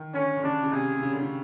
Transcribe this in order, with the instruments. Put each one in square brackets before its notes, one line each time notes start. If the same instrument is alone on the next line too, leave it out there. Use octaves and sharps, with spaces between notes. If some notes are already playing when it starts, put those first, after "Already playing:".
Already playing: [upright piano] D#3
[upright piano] D3 [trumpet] C#4
[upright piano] D3
[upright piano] C#3 [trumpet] D4
[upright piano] C#3
[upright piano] C3 [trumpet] G#4
[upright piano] C3
C#3
D3
C#3